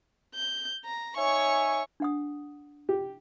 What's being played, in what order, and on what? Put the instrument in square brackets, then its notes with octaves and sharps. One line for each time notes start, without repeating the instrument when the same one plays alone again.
[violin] G6
A#5
[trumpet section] D#4 E5 G#5 [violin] C#5 C#6
[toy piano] D4 F#5 D#6
[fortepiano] G4